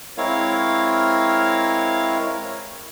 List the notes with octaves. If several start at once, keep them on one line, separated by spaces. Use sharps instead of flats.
G#3 C4 E4 A#4 C#5 F5